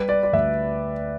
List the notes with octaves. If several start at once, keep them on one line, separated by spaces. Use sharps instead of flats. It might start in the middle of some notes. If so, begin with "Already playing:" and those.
Already playing: G3 B4
D5
D5
D2 E5